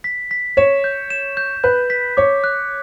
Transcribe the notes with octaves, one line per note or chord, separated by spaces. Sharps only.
B6
B6
C#5 E7
G6
E7
G6
B4 G6
B6
C#5 D6
F#6